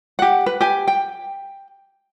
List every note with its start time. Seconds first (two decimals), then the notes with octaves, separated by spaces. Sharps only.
0.19 G4 F#5
0.46 B4
0.61 G4 G#5
0.88 G5